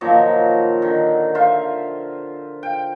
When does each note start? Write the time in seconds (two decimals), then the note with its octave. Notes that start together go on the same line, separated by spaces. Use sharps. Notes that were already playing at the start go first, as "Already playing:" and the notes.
0.01 A#2 D#3 F3 F#3
0.82 D3 D#3
1.35 F4 C5 E5
2.63 G5